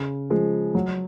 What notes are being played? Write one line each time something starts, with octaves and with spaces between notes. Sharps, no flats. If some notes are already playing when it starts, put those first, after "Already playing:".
Already playing: C#3
F3 G#3
F#3